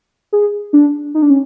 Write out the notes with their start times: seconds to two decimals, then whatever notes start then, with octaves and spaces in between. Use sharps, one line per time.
0.33 G#4
0.73 D4
1.15 D#4
1.22 D4
1.30 C#4